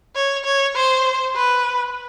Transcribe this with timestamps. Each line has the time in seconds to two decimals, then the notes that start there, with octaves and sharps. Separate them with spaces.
0.15 C#5
0.45 C#5
0.76 C5
1.35 B4